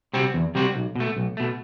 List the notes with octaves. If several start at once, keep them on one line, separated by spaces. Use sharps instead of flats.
C3 G3 C4 F#4
E2
C3 G3 C4 F#4
B1
B2 A3
B1
B2 A3